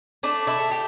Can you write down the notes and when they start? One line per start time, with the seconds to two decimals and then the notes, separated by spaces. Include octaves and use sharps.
0.23 A3 D4
0.47 E4
0.60 A3
0.71 G4